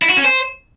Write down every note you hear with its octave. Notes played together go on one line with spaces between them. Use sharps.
E4
F#4
C#4
C5